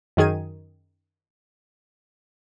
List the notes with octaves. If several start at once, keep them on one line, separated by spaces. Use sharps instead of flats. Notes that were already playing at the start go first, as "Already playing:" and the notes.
F#2 D#3 G#4 G#6 D#7